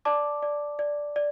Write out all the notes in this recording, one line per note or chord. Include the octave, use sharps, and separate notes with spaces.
D5 A5 D6
D5
D5
D5